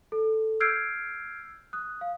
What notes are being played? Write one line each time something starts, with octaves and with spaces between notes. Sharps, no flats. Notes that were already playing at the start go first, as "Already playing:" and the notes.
A4
E6 F6 G6 G#6 C7 D7
D#6 F#6
F5